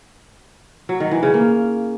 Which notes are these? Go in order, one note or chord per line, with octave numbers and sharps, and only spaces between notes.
F#3
D#3
E3
C#3
A#3